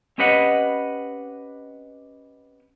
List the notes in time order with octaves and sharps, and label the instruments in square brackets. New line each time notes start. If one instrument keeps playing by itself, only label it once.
[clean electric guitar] C4 C#4 G4 B4 D#5 F#5